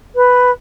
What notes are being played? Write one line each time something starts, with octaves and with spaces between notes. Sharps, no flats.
B4